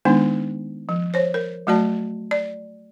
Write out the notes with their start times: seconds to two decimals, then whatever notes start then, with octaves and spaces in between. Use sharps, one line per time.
0.05 D#3 G#3 B3 D4 D#4
0.89 F3
1.14 C5 C#5
1.34 A#4
1.67 F#3 A3 F#4 D5 A5
2.31 D5